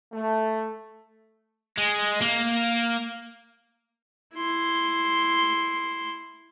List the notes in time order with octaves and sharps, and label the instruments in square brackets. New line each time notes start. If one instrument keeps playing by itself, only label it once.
[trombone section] A3
[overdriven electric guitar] G#3
A#3
[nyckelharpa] E4 C6